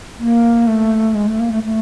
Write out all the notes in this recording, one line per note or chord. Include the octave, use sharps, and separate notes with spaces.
A#3
A3
G#3
A3
A#3
A3
A3